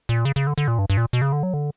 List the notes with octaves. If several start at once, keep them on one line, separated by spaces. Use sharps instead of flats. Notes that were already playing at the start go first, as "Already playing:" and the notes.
A#2
C#3
C#3
D3
D3
A#2
G2
G2
A#2
B2
C#3
D3
F#3
D3